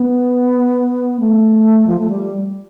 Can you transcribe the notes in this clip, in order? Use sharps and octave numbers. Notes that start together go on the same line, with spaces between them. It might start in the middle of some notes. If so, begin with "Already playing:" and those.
Already playing: B3
A3
F3
A3
G3